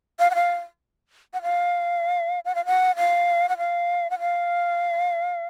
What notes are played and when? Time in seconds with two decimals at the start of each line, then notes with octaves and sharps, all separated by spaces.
0.19 F5
0.31 F#5
0.35 F5
1.34 F#5
1.43 F5
2.45 F#5
2.55 F5
2.66 F#5
2.97 F5
3.49 F#5
3.58 F5
4.10 F#5
4.20 F5